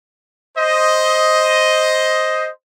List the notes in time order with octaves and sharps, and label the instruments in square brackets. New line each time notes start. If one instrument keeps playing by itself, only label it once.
[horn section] C5 D#5